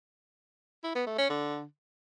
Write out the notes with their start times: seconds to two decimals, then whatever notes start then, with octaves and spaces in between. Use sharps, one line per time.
0.84 E4
0.95 B3
1.07 A3
1.18 C#4
1.30 D3